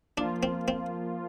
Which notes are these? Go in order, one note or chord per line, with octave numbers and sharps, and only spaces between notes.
F3 A#3 D4 F4
C4
C4